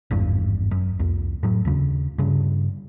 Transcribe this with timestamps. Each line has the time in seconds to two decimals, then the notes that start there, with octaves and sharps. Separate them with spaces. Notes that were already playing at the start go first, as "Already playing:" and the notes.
0.11 G#1 E2 G2
0.71 F#2
0.99 C2 F2
1.43 A2 F#3
1.65 D#2 C#3
2.18 G2 C#3